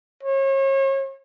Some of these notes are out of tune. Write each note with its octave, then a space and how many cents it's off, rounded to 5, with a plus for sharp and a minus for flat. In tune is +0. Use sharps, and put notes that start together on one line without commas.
C#5 -40